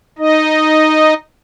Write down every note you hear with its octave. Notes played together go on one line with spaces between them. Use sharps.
D#4 D#5